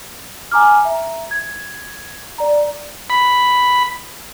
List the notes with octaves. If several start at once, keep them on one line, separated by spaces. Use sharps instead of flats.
G#5 A#5 D6 F6
E5 A#5
G#6
D5 A#5
B5